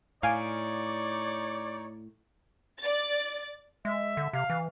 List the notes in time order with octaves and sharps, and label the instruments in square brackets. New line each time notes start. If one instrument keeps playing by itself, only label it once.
[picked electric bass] A2 [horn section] D#4 C#5 D5 [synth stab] F5 G#5 D7
[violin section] D5 A6
[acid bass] G#3 [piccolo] E5
[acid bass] D3
[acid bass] C3 [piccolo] F5
[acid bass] E3